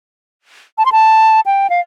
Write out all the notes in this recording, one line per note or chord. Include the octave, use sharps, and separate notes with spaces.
A5
C6
A5
G5
F5